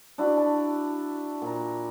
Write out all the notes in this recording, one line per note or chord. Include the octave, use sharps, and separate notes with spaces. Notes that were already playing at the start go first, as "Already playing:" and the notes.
D4 E4 F#4
A5
A#2 A#5